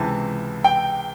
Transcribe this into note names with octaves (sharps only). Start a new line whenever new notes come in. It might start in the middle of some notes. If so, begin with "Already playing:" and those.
Already playing: C#2 C3 E3 A5
G5